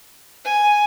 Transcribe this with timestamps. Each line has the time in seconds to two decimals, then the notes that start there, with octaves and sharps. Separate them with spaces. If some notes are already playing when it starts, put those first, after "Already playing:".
0.44 G#5